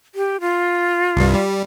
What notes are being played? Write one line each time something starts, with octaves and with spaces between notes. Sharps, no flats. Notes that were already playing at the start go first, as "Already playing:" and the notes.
G4
F4
C2 G2
G3